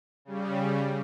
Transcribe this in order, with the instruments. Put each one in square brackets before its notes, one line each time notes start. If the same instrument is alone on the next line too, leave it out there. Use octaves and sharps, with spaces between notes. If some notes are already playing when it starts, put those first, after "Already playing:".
[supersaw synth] C#3 G3